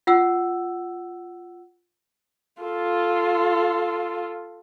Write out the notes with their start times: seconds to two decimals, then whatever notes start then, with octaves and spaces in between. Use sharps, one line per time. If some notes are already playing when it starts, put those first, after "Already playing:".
0.07 F4 F#5 E6
2.62 F4 A4